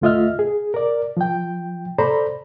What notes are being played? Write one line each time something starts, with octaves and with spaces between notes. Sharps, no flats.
D2 A3 F4 D#5 E5 F6
G#4
A#4 D5
F3 G5
A4 C5 D5 A#5 B5